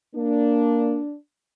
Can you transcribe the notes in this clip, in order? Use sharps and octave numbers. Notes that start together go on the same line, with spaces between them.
A#3 D4